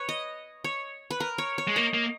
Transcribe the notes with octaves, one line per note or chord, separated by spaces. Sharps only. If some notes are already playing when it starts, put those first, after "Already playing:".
Already playing: B4 C#5
D#5
C#5
B4
A#4
C#5
C#5
G#3
A#3 D#5
A#3